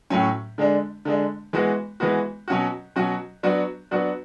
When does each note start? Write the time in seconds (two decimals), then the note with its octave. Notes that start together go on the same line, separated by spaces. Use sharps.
0.10 A2 F#3 C#4
0.58 D3 G#3 D4
1.05 D3 G#3 D4
1.53 E3 G#3 B3 F#4
2.00 E3 G#3 B3 F#4
2.48 B2 F#3 C#4 F#4
2.96 B2 F#3 C#4 F#4
3.43 F#3 B3 D4 F#4
3.91 F#3 B3 D4 F#4